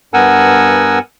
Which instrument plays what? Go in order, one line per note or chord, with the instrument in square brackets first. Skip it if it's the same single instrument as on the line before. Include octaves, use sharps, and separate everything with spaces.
[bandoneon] G2 B3 A#4 F#5 G#5 E6